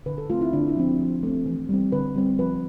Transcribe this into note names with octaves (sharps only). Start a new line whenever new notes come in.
D3 B4
A4
A3 C4 F4
E4
D3 D4
E4
F3 C4
F3
A3 C4
E3
G3 C4
D3 B4
G3 C4
F3 B4